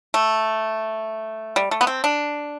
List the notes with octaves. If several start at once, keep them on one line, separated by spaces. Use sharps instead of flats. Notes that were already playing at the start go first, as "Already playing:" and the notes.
A3
G3
A3
B3
C4
D4